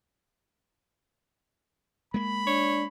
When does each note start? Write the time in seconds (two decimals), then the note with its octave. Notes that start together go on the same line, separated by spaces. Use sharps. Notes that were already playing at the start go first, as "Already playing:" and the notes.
2.14 G#3 A#3 B5
2.47 D4 C#5